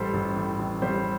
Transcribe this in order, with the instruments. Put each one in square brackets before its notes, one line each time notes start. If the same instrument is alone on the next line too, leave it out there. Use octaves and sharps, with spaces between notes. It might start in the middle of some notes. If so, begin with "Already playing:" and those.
Already playing: [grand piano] A1 A2 G3 A4 C5
A1
A2
A1
G3 C5